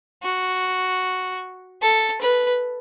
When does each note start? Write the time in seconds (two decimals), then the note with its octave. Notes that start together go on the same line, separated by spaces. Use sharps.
0.23 F#4
1.82 A4
2.21 B4